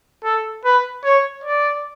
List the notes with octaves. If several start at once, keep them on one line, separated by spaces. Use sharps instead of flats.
A4
B4
C#5
D5